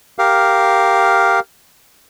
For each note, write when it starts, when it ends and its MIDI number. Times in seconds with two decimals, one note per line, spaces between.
0.19 1.40 67
0.19 1.40 70
0.19 1.40 77